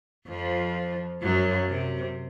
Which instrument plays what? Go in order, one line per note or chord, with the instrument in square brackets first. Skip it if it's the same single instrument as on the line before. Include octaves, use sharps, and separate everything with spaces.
[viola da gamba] F2 F3
F#2 F#3
C3